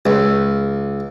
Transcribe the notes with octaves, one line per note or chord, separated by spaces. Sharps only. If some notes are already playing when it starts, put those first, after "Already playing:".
C#2